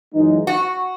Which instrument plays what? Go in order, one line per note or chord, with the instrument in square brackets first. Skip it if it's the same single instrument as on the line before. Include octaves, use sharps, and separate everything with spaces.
[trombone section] F#2 E3 G#3 D#4
[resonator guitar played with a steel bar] F#4